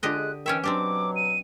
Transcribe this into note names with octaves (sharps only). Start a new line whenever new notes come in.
D3 G#3 F4 G4 D#5 F#6
D#3 E3 C#4 C#5 E5 G5
B2 F#3 C4 D4 G4 D6
D#7